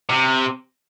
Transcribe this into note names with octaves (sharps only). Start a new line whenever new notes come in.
C3